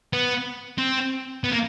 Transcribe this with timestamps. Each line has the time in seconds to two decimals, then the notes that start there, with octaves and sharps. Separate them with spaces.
0.13 B3
0.78 C4
1.44 B3
1.52 A#3